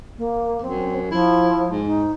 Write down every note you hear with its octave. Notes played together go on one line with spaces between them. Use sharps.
A#3
F#2 C4
F3 E4
G#2
D#4